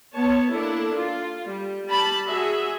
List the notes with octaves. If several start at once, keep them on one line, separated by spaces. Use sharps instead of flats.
B3 C#5 A5
A#3 D4 E4 A4
F4
G3
G3 A5 B5
F#4 G#4 E5